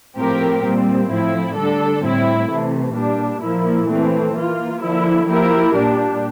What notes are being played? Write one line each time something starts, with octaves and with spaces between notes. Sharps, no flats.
A2 F3 C4 G4 A#4
A#2 G3 C4
A2 F3 A3 C4 E4
D3 G3 D4 A4
A2 G3 C4 E4
C3 E3 A3
A#2 G3 D4
A#2 F3 A#3 E4
E3 A3 C4
E3 A#3 F4
D3 F3 A#3 E4
F3 A#3 E4 G4 A#4
A#2 G3 D4 G4